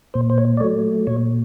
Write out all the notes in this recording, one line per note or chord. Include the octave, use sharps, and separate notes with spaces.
A#2 C5
C5
C#5
D5
F#3 A3 C#5
A#2 C#5